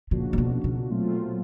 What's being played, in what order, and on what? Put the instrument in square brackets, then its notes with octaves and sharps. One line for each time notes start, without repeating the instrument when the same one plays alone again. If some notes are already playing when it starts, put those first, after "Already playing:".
[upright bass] A#2 [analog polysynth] C#3 F3 A#3 D4 F#4
[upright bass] C3
B2
B2
[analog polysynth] A#2 F#3 A3 C4 F4